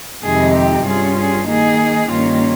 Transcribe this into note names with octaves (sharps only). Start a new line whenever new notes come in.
F2 C3 D#3 G#3 D#4 G#4
G4
G2 G3 C#4 F4 G#4
G#4
D#3 A#3 D#4 G#4
G2 D#3 A#3 C#4 F4